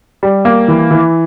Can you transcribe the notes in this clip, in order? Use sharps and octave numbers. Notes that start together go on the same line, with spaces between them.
G3
A#3
E3
E3